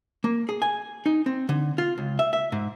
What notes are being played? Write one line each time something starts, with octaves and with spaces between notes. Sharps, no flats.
A#3
G#4
G#5
D#4
C4
D3
F4
C#2
E5
E5
G#2